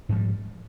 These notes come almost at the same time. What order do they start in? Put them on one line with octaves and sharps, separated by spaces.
G#2 F3 G3